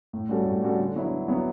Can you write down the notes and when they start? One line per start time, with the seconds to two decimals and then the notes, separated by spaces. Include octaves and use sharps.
0.13 A2
0.29 G3 C#4 F#4 A4
0.45 A2
0.62 G3 C#4 F#4 A4
0.79 D3
0.96 F#3 B3 E4
1.12 D3
1.28 F#3 B3 E4